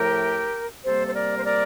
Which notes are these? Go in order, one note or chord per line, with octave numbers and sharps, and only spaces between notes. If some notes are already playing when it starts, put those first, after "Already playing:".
Already playing: A2 F3 A3 G4 A#4
C3 G3 A#3 A4 C5
C5
A#4 D5
C5
A#4 D5